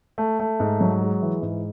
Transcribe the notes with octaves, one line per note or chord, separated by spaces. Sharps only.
A3
A3
G#2
F#3
G#3
E3
G#2